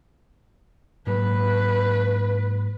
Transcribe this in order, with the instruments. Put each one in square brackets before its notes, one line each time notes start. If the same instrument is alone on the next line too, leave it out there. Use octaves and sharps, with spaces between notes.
[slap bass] G#2 F#3 A#3 [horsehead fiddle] B4